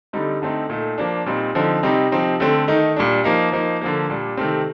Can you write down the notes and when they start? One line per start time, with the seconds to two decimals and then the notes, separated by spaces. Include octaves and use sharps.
0.13 D3 G3 C4 D#4
0.42 D3 A3 C4 D#4
0.69 A#2 A3 D#4
0.98 F3 A#3 D4
1.26 A#2 G3 C4 D#4
1.55 D3 F3 C4 D#4
1.83 C3 G3 C4 D#4
2.11 C3 F3 C4 D#4
2.40 D3 A3 C4
2.67 D#3 A3 D#4
2.96 A#2 G3 D4
3.24 F3 A#3 D#4
3.52 F3 A#3 D#4
3.81 D3 F3 A#3
4.10 A#2 G3 D4
4.37 C3 D#3 A3 C4